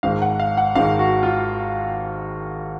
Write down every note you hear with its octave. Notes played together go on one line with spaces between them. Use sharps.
G#1 G#2 D#3 F5
F#5
F5
F#5
G#1 G#2 D#3 F5
F#4
F4